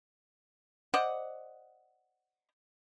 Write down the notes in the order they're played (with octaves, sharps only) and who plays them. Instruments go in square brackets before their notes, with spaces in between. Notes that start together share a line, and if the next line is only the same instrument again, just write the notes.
[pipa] C5 D5 D#5 F#5